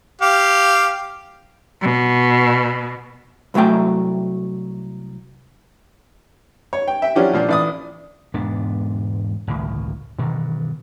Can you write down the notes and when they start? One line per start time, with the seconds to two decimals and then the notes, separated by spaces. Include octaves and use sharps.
0.21 G4 F5
1.82 B2
3.54 C2 F3 F#3 A3 G5
6.73 C#5
6.88 G5
7.02 E5 G5
7.16 F3 F#3 C#4 D4 E4 G4
7.33 A#2 F3 D4
7.49 A1 D5 D#6
8.34 E1 G#2 B3 D4
9.47 G1 C#2 A2 D#3
10.19 G2 B2 D#3 E3